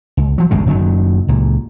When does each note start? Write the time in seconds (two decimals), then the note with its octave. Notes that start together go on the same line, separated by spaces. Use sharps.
0.17 C#2
0.38 F3 F#3
0.51 G#1 C#2 G2 C#3
0.66 F#1 D#3 F#3
1.28 C#2 A#2